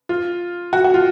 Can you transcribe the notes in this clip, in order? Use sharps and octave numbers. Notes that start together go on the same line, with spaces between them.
F4
F#4
F#4
F4